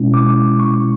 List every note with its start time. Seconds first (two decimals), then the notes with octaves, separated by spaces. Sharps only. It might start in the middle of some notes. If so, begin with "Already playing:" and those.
Already playing: B2 G#3 C#4 E4
0.14 D6
0.60 C#6